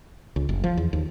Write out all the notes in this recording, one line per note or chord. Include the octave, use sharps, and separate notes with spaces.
C#2
F#1
F3
E2
D#2